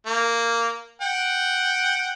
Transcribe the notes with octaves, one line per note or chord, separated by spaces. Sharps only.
A#3
F#5 G5